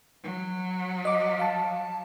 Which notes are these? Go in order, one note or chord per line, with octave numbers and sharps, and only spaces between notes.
F#3
D#5 D6
F5 A5